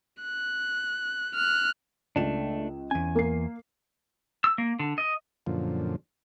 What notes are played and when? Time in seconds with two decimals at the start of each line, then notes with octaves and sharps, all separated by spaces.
0.22 F#6
1.35 F6 F#6
2.16 C#2 A3 D4 E7
2.91 E2 C#4 G#5 D#7
3.15 A#3 C7
4.44 E6
4.58 A#3
4.79 D3
4.98 D#5
5.46 F#2 A#2 D3 F3